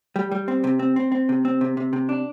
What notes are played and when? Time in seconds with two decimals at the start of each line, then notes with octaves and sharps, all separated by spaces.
0.16 G3
0.31 G3
0.48 C4
0.64 C3
0.79 C4
0.96 C4
1.12 C4
1.29 C3
1.45 C4
1.61 C3
1.77 C3
1.93 C3
2.09 D4